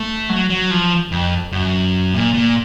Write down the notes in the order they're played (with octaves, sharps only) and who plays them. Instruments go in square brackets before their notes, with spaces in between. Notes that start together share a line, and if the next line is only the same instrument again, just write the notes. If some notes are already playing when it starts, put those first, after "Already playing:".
Already playing: [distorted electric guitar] A3
F#3
F#3
F3
F2
F#2
A#2
A#2